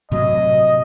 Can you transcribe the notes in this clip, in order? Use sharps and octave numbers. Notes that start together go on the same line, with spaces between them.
A2 C3 F#3 D#5